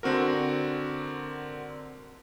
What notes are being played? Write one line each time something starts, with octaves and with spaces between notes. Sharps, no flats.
D3 C4 F#4 A#4